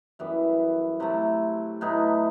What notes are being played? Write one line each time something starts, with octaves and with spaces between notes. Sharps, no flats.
F#2 E3 G3 B3
C3 F#3 A3 E4
A2 F#3 B3 D#4